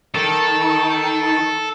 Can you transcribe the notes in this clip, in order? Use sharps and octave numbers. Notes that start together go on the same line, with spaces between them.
D#3 A4